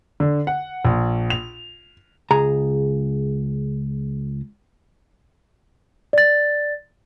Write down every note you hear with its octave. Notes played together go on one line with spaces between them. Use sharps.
D3
F#5
A#1
F7
C#2 G#4 A#5
D5 A6